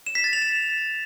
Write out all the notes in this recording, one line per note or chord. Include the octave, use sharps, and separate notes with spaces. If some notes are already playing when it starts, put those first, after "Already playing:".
E7
B6
A6
F7
E7